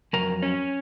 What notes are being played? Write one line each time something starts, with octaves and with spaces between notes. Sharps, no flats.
F2 C3 F#3 A#4
C#4